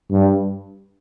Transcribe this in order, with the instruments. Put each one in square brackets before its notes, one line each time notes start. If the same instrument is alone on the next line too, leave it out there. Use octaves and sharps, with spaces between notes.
[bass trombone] G2